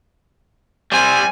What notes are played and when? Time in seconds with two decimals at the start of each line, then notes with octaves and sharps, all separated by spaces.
0.92 G3 C4 G#5